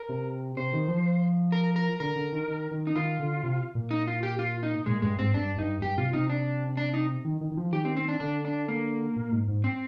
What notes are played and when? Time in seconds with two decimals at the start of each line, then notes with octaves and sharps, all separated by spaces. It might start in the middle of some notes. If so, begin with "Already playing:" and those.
Already playing: A#4
0.09 C3
0.57 C3 C5
0.73 D#3
0.88 F3
1.52 A#4
1.76 A#4
2.00 D3 A#4
2.16 D3
2.32 D#3
2.48 D#3
2.71 D#3
2.87 D#4
2.96 D#3 F4
3.19 D3
3.43 C3
3.75 A#2
3.91 D#4
4.07 F4
4.23 G4
4.39 F4
4.63 D#4
4.86 A#2 G#3
5.02 G2 G#3
5.18 G#2 C4
5.34 G2 D4
5.58 G2 D#4
5.81 G2 G4
5.97 C3 F4
6.13 C3 D#4
6.30 D4
6.77 D4
6.94 D#4
7.25 D#3
7.41 D#3
7.52 D#3
7.57 F3
7.72 D#3 G4
7.85 C4
7.97 C4
8.08 D4
8.20 D3 D4
8.45 D4
8.68 A#3
9.16 A#2
9.32 G#2
9.48 G#2
9.64 C4